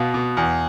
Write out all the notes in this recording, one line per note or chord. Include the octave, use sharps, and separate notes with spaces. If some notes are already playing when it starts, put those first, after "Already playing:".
Already playing: B2 B3 F5
B2
E2